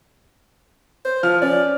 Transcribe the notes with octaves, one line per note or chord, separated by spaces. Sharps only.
C5
F3 F6
C#4 D5